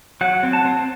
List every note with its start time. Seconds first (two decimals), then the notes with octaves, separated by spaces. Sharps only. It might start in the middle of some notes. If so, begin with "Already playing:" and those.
0.21 F#3 F#5
0.43 C4
0.53 A5
0.65 C4